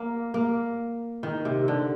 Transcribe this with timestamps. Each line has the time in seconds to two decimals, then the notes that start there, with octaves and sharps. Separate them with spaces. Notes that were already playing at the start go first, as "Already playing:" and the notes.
Already playing: A#3
0.34 A#3
1.23 D#3
1.45 C3
1.68 D3